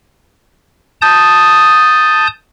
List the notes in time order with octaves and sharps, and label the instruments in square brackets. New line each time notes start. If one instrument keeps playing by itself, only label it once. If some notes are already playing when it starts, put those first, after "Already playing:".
[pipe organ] A5 D#6 G6